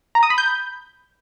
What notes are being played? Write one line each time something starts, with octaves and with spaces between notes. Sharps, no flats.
A#5
D#6
B5
G6